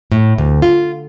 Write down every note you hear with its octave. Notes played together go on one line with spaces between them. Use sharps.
A2
D2
F4